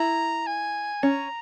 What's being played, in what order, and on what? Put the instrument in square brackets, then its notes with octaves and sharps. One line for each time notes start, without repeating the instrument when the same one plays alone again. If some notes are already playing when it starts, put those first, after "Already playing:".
Already playing: [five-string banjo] E4 [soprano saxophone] A#5
[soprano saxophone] G#5
[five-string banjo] C#4 [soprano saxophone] A#5